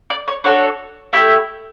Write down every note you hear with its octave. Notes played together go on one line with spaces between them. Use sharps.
D5
C#5
D4 F#4 A4 C#5
A3 E4 G4 E5